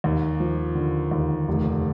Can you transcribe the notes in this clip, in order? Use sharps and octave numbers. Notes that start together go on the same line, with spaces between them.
D#2
F3
D3
D#2
F1